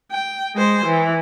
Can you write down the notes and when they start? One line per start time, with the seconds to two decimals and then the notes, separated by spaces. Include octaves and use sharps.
0.12 G5
0.55 G#3 C5
0.86 E3